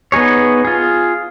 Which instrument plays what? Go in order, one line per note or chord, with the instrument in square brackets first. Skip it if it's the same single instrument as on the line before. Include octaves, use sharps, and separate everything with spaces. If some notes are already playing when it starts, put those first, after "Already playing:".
[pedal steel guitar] B3 D#4 G#4 C#5
F4 G#4